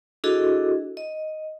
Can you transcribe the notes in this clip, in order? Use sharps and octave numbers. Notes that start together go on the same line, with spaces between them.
D4 E4 F#4 G#4 A4 D#5
D#5